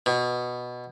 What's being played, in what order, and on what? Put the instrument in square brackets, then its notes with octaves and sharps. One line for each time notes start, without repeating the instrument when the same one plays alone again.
[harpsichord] B2